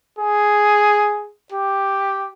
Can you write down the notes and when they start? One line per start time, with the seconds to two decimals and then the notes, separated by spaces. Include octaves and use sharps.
0.19 G#4
1.52 G4